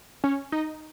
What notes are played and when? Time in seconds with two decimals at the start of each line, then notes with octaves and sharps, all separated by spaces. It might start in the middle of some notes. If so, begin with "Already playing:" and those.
0.24 C#4
0.52 D#4